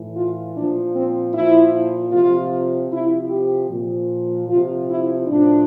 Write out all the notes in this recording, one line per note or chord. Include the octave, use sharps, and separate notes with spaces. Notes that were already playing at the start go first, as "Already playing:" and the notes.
Already playing: A2 E3
F4
A#2 F3 D4
C4
A#2 F3 E4
C3 F3 F4
C3 F3 E4
G4
A#2 F3
C3 F3 F4
E4
A2 F3 D4